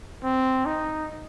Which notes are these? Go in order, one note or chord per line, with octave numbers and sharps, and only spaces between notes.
C4
D#4